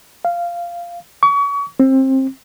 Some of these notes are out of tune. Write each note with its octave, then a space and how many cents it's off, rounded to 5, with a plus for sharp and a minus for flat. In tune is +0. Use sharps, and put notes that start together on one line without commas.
F5 -10
C#6 +35
C4 +25